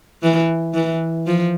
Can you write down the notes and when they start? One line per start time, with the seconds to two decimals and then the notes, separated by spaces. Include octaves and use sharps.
0.23 E3
0.74 E3
1.26 F3